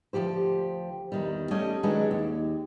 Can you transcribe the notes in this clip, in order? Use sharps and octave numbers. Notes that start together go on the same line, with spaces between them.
D2 C3 F3 G4 C5
E2 D#3 G3
G3 A3 C#4 C#5 D#5
D#3 F#3 G#3 C#4 D4 B4
D#2